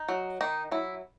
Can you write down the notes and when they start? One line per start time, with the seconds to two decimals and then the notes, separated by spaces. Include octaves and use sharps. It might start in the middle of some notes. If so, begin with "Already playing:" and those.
Already playing: D#4
0.09 F#3
0.41 D#3 D#4
0.71 F#3 E4